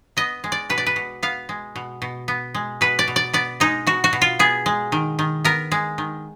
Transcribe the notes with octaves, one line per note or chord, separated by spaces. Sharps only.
B3 D#5
G#3
D5
B2 B4
D5
B4
B2
B3 F5
G#3
B2
B2
B3
G#3
B2 B4
D5
B2
D5
B3 D5
G#3 D#4
B2 F#4
F#4
B2
F4
B3 G#4
G#3
D#3
D#3
B3 A#4
G#3
D#3